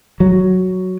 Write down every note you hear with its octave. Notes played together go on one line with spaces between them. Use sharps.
F#3